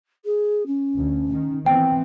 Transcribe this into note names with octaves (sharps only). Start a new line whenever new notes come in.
G#4
C#4
D2
D#3
E3 B3 C4 G5